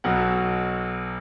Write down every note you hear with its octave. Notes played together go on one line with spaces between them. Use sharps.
B1 B2 F#3 F#5